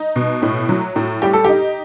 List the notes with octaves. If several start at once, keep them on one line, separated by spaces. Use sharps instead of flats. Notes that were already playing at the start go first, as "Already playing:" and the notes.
Already playing: D#4
B2
A2
F#3
A2
G3 G4
A4
D#4 G4